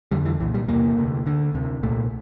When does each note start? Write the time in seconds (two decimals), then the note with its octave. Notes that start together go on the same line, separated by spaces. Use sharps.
0.11 F2 D3 G3
0.26 E3
0.40 C2 A#2 E3
0.54 G3
0.68 E2 C3 A#3
0.97 D2 C3
1.26 D2 D3
1.54 D2 C3
1.83 C2 A#2 A3